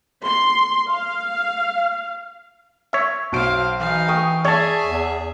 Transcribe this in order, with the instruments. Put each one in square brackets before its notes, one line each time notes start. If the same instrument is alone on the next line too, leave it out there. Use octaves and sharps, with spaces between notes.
[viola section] C6
F5
[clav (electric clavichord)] C#5 E5
[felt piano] B1 D7 [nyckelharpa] C5 F5
[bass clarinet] E3 [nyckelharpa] D#4 F5
[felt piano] G5 C#6 D#6
[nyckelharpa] G#4 E5 [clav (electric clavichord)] C#5 A5 [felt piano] D5
[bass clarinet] E2